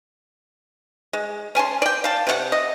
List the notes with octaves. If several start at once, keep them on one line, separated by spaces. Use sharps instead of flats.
G#3
C#4 G#5 A5 C6
D5 G5
F5 A5
C3 C#4 F#5
D#5